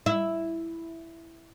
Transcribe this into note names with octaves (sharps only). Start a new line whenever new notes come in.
E4